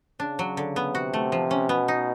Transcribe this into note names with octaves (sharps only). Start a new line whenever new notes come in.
C#3 D4
F#3
D3
B3
C3 F#4
A3
F3
C#4
B2 B3
D#4